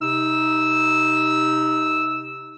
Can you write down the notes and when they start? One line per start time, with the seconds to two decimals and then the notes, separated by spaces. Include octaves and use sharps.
0.01 C3 D#4 E6